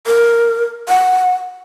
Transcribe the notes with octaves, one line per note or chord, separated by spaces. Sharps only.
A#4
F#5